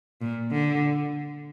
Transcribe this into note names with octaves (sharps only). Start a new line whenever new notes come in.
A#2
D3